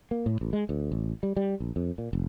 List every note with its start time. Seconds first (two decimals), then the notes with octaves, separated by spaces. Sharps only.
0.11 A#3
0.26 A2
0.41 A1
0.53 G#3
0.69 D2
0.92 A1
1.23 G3
1.37 G3
1.60 A#1
1.76 F2
1.98 A#2
2.13 F1